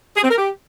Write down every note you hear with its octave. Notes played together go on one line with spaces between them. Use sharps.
G#4
C4
A#4
G4